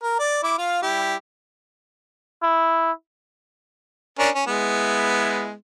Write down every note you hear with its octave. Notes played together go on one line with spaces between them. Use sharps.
A#4
D5
E4 D6
F4 F5
G3 E4 G4
E4
C#4 D4 A#4
C#4
G#3 B3 E4